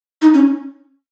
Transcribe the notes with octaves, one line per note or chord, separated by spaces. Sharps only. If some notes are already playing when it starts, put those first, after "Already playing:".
D#4
C#4